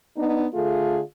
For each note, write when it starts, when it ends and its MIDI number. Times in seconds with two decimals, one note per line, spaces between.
0.16 0.46 59
0.16 0.46 62
0.16 0.46 63
0.54 1.01 50
0.54 1.01 57
0.54 1.01 65
0.54 1.01 68